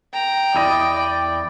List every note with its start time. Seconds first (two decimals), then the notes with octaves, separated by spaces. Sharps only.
0.13 G5 A#5
0.55 E2 E4 D5 D#5
0.94 D5